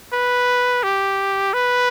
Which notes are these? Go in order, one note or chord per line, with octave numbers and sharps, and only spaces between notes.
B4
G4
B4